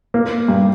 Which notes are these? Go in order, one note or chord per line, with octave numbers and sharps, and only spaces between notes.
A#3
G2